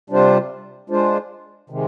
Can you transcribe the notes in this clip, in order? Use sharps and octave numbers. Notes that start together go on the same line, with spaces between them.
C3 G3 D4 F4 C5
G#3 D4 F4 C5
C3 D#3 G#3